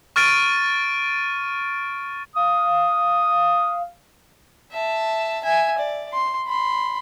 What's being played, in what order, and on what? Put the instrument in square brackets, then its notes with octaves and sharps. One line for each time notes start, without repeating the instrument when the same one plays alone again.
[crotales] C#6 F6 A6 D7 D#7
[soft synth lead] F5 [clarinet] D#6
[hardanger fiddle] E5 A5
E5 G#5
D5
C6
B5 C6